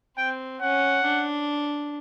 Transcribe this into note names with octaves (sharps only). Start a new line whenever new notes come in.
C4 G5
C#4 F#5
D4